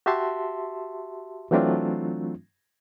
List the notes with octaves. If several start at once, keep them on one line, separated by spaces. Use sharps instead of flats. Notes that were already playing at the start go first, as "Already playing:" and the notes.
F#4 G4 E5 A5 C6
E3 F#3 A3 C4 D4 F4